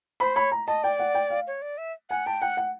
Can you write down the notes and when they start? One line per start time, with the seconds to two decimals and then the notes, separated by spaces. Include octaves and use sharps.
0.20 C5 B5
0.36 C#5 B5
0.52 A#5
0.67 D#5 A5
0.83 D5 G5
0.99 F#5
1.15 G5
1.30 F5
1.47 C#5
1.62 D5
1.78 E5
2.10 F#5 G#5
2.26 G5 A5
2.42 F#5 G5
2.57 F#5